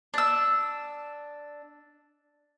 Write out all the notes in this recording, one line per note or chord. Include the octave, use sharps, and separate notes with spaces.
D4 E6